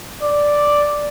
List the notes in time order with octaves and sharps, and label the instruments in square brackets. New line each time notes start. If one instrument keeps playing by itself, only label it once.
[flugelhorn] D5